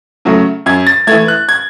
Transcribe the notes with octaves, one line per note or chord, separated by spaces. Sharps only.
C#3 F#3 A3
F#2 G#6
A6
E3 A3 G#6
F#6
G#6